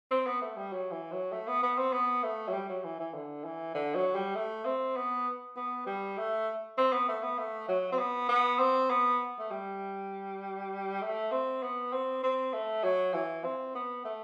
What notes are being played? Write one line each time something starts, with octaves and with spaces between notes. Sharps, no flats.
C4
B3
A3
G3
F#3
E3
F#3
A3
B3
B3
C4
B3
A3
F#3
G3
F#3
E3
E3
D3
E3
D3
F#3
G3
A3
C4
B3
B3
G3
A3
C4
B3
A3
B3
A3
F#3
C4
B3
B3
C4
B3
A3
G3
A3
C4
B3
C4
C4
A3
F#3
E3
C4
B3
A3